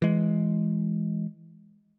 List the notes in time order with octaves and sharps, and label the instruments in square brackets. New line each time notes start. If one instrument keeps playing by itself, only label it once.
[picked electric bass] E3 G#3